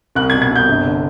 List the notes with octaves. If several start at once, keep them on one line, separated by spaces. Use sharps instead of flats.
C2 F#6
G#6
B2
G#6
C2 G6
G1
D3